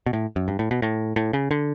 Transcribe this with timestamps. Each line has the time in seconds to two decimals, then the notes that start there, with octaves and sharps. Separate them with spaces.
0.06 B2
0.13 A2
0.36 F#2
0.48 G2
0.59 A2
0.71 B2
0.82 A2
1.16 A2
1.33 C#3
1.51 D3